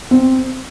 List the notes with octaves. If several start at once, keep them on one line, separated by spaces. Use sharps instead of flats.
C4